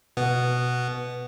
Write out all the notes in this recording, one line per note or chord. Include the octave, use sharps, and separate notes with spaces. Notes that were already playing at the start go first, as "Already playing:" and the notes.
B2 B3